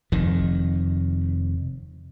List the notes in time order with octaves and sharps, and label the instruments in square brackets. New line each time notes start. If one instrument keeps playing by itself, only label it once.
[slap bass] F1 F2 D#3